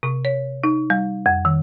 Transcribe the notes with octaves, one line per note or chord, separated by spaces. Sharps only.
C3
C#5
D#4
G3
F2
D#3